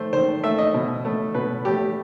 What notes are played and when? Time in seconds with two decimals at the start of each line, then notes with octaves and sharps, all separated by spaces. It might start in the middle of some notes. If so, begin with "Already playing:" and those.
Already playing: D#3 A3 C5
0.13 D#3 C5
0.43 A3 E5
0.58 D#5
0.74 B2
1.05 A3
1.34 B2 B4
1.65 A3 G4